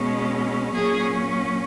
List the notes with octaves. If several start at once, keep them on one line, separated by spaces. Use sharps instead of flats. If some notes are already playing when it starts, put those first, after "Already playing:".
Already playing: B2 G#3 C#4
A#2 F#3 C#4 G#4